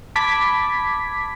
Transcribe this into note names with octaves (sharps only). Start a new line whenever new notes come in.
A5 B5 D6 G#6 B6